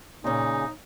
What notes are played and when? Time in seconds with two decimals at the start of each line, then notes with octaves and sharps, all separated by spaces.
0.24 A#2 C#3 D#4